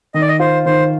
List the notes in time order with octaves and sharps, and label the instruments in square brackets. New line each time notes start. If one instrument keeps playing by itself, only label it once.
[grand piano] D#3 [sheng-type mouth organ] D#5
[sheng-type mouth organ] D5
D#5
[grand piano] F4 [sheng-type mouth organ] C5
[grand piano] D#3 [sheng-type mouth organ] C5